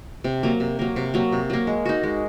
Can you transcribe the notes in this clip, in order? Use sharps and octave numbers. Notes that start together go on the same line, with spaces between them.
C3
F#3 A#3
C3
F#3 A#3
C3
F#3 A#3
C3
F#3 A#3
G#3
D#4 F#4
G#3